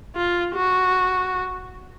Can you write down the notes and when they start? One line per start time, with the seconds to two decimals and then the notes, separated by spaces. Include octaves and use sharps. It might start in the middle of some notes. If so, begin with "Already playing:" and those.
0.16 F4
0.55 F#4